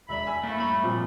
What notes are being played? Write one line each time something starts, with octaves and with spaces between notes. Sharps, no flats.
E1 D5 E5 B5
G#5 E6
A3 A#3 E4
G2 C#5 B5
A#2 F3 C4